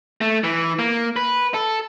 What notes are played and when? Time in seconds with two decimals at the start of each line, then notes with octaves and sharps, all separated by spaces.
0.21 A3
0.44 E3
0.79 A#3
1.16 B4
1.54 A4